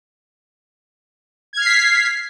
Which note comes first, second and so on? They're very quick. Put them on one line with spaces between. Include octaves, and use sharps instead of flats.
G#6 F6 C7 B6